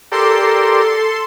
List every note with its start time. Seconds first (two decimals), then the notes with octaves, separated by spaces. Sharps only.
0.12 G4 A4 A#4 D5 C6